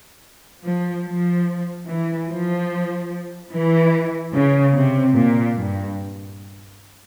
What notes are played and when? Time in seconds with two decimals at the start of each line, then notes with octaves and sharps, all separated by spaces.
0.63 F3
1.04 F3
1.86 E3
2.28 F3
3.51 E3
4.33 C#3
4.75 C3
5.15 A#2
5.57 G2